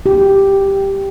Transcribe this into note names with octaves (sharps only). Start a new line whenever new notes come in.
G4